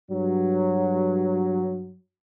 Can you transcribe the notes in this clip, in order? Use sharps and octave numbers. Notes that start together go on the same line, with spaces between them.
G2 F#3